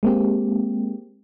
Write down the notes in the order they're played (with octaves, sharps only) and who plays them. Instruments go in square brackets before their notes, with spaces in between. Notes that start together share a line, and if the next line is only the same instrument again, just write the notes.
[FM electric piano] G#3 A#3 C4 G4